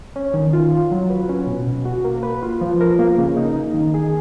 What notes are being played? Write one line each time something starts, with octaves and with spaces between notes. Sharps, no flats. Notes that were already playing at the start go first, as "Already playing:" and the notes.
C#4
D#3
F4
F4
F#3
B4
C#4
B2
B2
F#4
A#3
B4
F4
F3
A#4
A#3
C#3
D#4
D#4
D#3
G#4